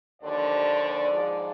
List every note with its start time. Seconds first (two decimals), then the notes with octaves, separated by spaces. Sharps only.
0.22 D#2 D3 F3 D5
1.11 G#2 F3